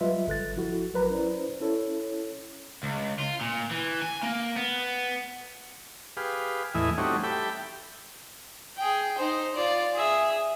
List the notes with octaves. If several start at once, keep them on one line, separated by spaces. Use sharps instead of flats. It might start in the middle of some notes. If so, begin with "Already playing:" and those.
F#3 G3 F4 B4 D#5 E5
G1 A4 F#6 A6
F3 E4 F#4 A4
A1 F#3 A#4 B4 A#5
C#4 E4 B4 C5 D5
C#4 E4 A4 C#5
C#2
F4
A#2
E3
G#5
A#3
B3
G4 G#4 B4 F5
E2 A2 E3 D#5 E5 G#5
G3 A3 C4 C#4 D#4 F#4
G4 A4 E5 G5 B5
G#4 G5
D#4 C5
F4 D5
G#4 E5